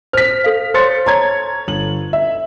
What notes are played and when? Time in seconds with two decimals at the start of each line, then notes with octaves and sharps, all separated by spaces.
0.13 C5 F6 B6
0.44 A4 F5
0.74 C5 C#5 C6 A6 C#7
1.06 C#5 A5 A#5 G#6
1.68 G1 F#7
2.13 E5